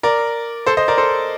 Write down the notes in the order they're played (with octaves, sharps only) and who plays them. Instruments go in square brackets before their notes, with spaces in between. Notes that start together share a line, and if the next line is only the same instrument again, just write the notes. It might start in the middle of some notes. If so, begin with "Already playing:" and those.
[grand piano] A#4 D5
A4 C5
C5 D#5
A#4 D5
A4 C5